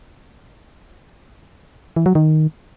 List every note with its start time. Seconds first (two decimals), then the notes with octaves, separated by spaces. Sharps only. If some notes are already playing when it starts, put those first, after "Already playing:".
1.96 E3
2.06 F#3
2.15 D#3